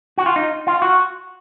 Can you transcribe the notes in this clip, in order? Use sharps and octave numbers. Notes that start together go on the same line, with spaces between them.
F#4
F4
D#4
F4
F#4